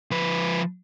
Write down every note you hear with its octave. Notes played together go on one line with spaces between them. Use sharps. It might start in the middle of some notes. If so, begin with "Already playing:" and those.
F3 B4